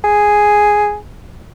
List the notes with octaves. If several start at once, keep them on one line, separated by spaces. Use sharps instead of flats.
G#4